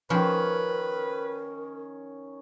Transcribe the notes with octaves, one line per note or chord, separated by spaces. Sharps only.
D#3 F3 C#4 A#4 B4